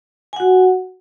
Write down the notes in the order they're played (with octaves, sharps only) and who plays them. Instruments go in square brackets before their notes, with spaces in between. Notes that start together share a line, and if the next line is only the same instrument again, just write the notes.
[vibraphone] G#5
F#5
F#4